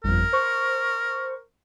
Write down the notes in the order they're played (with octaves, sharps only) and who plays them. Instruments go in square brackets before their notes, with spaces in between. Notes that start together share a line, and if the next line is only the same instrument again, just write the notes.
[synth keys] G1 F2 [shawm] A#4
[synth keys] C5 C#6